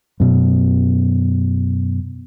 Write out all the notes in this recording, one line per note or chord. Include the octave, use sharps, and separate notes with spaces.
F#2 B2